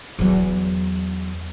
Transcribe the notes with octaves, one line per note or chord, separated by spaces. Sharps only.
E2 F#3